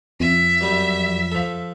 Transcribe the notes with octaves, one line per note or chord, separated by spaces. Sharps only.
F2 E5
F#2 G3
F3 A4